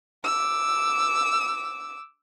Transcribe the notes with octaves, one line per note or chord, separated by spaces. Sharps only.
D6 E6